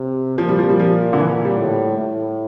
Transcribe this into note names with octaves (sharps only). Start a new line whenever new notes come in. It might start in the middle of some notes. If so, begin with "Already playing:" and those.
Already playing: C3
A#2 F3
G3
F3
G3
F3
D3
E3
G3
A2
A2